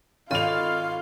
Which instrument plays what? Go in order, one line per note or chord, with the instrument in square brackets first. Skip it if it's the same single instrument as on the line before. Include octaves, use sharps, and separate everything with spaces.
[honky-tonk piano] G#1 F7 [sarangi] F4 [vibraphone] A4 D#5 B5 [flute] F5